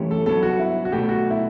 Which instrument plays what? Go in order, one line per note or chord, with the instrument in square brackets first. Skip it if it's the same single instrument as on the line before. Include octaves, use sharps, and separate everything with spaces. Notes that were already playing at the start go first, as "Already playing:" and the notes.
Already playing: [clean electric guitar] F#2 E3 A3 C#4 G4
[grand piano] A4
[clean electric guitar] G2 F#3 B3 [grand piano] A4
[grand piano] F#4
E4
F#4
[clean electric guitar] B1 B2 A3 [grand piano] G4
[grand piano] F#4
E4